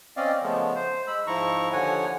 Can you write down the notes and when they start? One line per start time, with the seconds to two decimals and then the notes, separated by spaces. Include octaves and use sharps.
0.17 C4 C#4 D5 D#5 F5
0.42 C#3 F3 G#3 A3 B3
0.75 C5
1.07 G#3 B5 E6
1.27 G#2 F3 E4 A#5 C#6
1.73 D#2 D3 F3 C#5 F#5 G#5